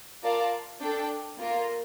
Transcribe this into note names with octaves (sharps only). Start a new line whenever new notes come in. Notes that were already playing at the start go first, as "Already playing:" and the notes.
F4 A#4 D5 F5 A5
D4 A4 D5 G5
A#3 F4 A#4